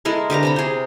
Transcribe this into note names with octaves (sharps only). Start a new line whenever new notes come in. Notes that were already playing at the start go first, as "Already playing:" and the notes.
G#3 E4 A4 A#4
D3 G4 B4 A#5
C3 A#5 B5
G#4 C5